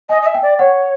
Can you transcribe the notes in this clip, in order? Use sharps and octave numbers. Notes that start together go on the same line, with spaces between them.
D#5 G#5
D#5
E5
G5
D5
C#5 F#5